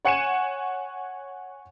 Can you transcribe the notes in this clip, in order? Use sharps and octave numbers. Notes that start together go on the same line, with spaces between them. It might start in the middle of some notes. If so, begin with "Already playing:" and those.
C#5 F#5 G#5 C#7 D#7 E7